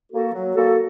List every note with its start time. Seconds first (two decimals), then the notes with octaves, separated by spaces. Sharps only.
0.11 A#3 F#4 A4
0.33 F#3
0.55 A#3 F#4 A4